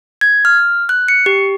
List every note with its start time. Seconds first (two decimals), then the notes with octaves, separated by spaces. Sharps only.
0.21 G#6
0.45 F6
0.89 F#6
1.08 C#7
1.26 G4